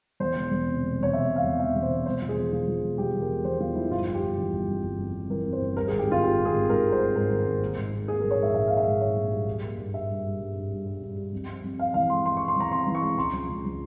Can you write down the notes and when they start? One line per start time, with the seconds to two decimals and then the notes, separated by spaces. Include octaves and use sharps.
0.20 E2 C5
0.36 E1
0.51 E2
0.67 C3
0.82 E1
0.98 E1 C#5
1.13 E1 E5
1.28 E1
1.36 F5
1.44 E2
1.59 E1 E5
1.75 E2
1.83 C5
1.90 E1
2.06 E1 C5
2.21 F3
2.29 G#4
2.36 E2
2.52 F3 F4
2.68 F3
2.82 E1
2.98 E2 G4
3.14 E2
3.21 A#4
3.29 E1
3.45 E2 C5
3.60 E2 F4
3.75 F3 E4
3.91 G1 F4
4.07 G1
4.15 G4
4.23 G1
4.38 E3
4.53 G1
4.68 F2
4.83 G1
4.99 F2
5.14 F2
5.30 E3 A#4
5.46 F2
5.53 C5
5.61 G1
5.77 G3 A#4
5.88 G#4
5.92 G#1
5.99 G4
6.08 G#1 F4
6.23 G#1 G4
6.38 G#2
6.45 G#4
6.54 G#1
6.69 G#2 A#4
6.85 G3
6.92 C5
7.00 G3
7.16 G#2 A#4
7.30 G#1
7.46 G#1
7.61 A#3
7.78 G#2
7.93 G#2
8.08 A#3 G#4
8.20 A#4
8.24 A#1
8.31 C#5
8.39 G#2 E5
8.54 G#2 E5
8.68 A#3 F5
8.77 E5
8.86 G#2
9.01 G#2 C#5
9.16 A#1
9.32 G3
9.47 G3
9.63 A#3
9.78 G2
9.93 G3 E5
10.09 G2
10.25 G3
10.40 G2
10.56 G2
10.71 G2
10.86 G3
11.02 G2
11.17 G3
11.33 F2
11.48 C4
11.64 F2
11.78 C4 F5
11.94 E3 F5
12.10 G#3 C6
12.25 G#3 C6
12.37 C#6
12.41 C4
12.48 C6
12.56 E3 A#5
12.72 C4 C6
12.87 E3
12.95 C#6
13.03 G#3
13.17 C#2 C6
13.33 F3
13.49 C#2
13.65 F3